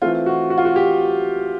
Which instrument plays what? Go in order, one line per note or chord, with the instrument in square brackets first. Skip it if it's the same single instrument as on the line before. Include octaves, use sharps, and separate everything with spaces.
[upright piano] E3 A3 C4 F4
F#4
F#4
F4
F#4
G4